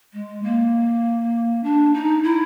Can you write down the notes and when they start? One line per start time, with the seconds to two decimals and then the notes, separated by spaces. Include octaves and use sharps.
0.13 G#3
0.43 A#3
1.64 D4
1.94 D#4
2.23 E4